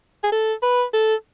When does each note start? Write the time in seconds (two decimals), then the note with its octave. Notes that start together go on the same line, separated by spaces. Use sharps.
0.24 G#4
0.32 A4
0.63 B4
0.93 A4